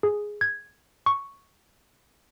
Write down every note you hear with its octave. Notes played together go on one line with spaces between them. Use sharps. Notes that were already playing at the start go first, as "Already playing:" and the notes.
G#4
G#6
C#6